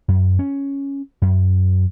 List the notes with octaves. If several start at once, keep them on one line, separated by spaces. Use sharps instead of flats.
F#2
C#4
F#2